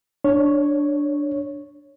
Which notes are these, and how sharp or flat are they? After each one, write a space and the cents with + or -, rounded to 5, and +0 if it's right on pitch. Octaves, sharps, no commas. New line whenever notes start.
D4 +0 C#5 -5